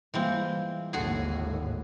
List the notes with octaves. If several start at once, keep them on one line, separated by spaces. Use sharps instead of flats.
E3 G3 G#3 A#3 C4 F4
G#1 D#2 A2 D3 F#4 G#4